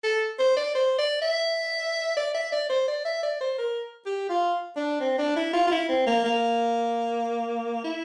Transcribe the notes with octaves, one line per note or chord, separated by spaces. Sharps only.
A4
C5
D5
C5
D5
E5
D5
E5
D5
C5
D5
E5
D5
C5
A#4
G4
F4
D4
C4
D4
E4
F4
F4
E4
C4
A#3
A#3
E4